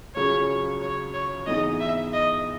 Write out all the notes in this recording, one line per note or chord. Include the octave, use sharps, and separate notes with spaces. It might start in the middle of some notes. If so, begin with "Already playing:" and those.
C#2 C#3 F#3 C#4 G#4 C#5
C#5
C#5
G#2 E3 B3 D#4 G#4 D#5
E5
D#5